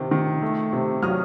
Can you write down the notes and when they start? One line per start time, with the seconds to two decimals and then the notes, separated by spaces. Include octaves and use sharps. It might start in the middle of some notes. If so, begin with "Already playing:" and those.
Already playing: C3 D#3
0.11 D#3
0.42 A3
0.73 C3
1.02 F#3 D#6 F6